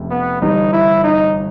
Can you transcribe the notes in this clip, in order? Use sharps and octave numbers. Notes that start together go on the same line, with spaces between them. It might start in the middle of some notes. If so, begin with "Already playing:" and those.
Already playing: F1 F2 C#3
B3
G1 G2 E3 G3 D#4
E4
D#4